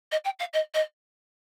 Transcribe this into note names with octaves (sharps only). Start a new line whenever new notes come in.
D#5
G5
F5
D#5
D#5